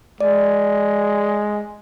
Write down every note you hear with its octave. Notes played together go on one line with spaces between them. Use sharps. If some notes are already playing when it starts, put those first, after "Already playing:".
G#3 D5